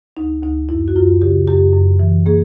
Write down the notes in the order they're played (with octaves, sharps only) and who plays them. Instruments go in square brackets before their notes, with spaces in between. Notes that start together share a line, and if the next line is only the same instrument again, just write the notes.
[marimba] D2 D#4
D2 D#4
F#2 E4
F#4
F#2 F4
C#3 G4
F#2 G4
F#2
E3
A#3 G#4